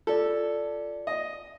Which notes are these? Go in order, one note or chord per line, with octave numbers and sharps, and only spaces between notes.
F4 A4 D5
D#5